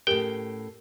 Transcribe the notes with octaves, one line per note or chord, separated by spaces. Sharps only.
A2 C#4 G4 A#4 G5